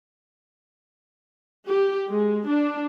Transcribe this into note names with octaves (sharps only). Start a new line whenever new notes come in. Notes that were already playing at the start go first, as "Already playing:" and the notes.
G4
G#3
D4